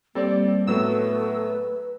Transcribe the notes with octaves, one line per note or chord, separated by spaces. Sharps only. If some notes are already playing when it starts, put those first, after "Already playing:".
G3 A#3 C4 A4 D5
A2 F#3 A3 B3 B4 E6